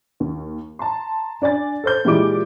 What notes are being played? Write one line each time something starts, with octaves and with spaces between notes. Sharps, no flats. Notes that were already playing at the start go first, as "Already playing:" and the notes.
D#2
A5 A#5 C6
D4 D5 G#5 A6
A4 C5 G6
A#2 E3 G3 G#3 D6 D7